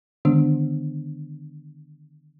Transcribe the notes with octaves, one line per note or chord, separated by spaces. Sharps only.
D3 D#3 G#3 B3 D4